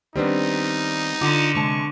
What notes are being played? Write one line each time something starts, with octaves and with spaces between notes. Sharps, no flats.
D#3 G3 B3 C4 D4 D#4
D3 F4 D6
C3 G#3 A5 C#6